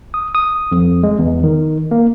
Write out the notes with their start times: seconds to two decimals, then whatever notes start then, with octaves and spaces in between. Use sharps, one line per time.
0.14 D#6
0.35 D#6
0.72 F2
1.03 G#3
1.19 E2
1.44 D#3
1.91 A#3